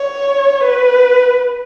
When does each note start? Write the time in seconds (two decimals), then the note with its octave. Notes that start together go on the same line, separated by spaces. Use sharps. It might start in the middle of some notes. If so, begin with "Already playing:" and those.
Already playing: C#5
0.63 B4